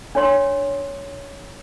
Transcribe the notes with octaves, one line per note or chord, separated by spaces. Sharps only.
D4 C#5 C6